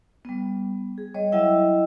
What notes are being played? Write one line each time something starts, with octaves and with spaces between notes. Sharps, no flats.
G3 B3
G#4
G3 C#5 D#5
F#3 E4 D#5 E5 G5 E6